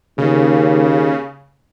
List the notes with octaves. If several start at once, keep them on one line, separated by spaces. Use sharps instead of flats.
D#2 C#3